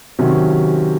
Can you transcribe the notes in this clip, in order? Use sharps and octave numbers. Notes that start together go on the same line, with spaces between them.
C3 D#3 F#3 C#4